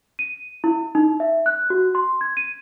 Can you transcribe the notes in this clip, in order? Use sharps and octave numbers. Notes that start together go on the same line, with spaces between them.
D#7
E4
D#4
E5
F#6
F#4
C6
G#6
D#7